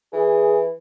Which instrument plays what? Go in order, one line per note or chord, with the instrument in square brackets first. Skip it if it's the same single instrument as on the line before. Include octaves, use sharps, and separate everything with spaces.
[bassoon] E3 [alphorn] G#4